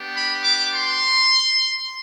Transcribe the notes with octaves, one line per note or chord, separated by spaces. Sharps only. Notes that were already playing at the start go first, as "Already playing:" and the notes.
Already playing: B3 D4 G4
B5
D6
C6